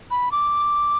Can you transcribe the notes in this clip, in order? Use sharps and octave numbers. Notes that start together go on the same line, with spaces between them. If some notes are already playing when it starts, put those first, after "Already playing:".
B5
D6